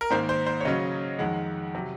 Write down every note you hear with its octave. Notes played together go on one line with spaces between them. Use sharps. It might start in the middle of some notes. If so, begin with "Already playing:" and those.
A#4
G#2 D#3 A#3 C5
C5
C5
C#5
C#3 F#3 C#4 D#5
F2 D#3 G#3 F#5
C3 F#3